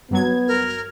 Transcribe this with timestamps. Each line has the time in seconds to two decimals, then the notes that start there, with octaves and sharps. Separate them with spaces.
0.11 G2 F#3 B3 G#6
0.48 A#4